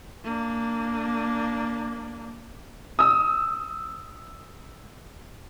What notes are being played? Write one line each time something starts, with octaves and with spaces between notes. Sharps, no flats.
A#3 D4
D#6 E6